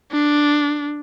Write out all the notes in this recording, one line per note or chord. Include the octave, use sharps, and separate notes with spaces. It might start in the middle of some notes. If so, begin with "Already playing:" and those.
D4